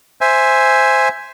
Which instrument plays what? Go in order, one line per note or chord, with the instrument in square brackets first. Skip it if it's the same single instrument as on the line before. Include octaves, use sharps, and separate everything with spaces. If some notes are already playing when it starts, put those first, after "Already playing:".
[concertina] C5 E5 G#5